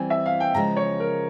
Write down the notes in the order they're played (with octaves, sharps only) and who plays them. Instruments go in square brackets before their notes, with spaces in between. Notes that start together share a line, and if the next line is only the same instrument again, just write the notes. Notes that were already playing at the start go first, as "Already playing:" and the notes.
Already playing: [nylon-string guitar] E3 G3 C4 [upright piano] G#5
[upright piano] E5
F5
G5
[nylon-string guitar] C#3 F3 G#3 C#4 [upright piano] A#5
[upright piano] C#5
A#4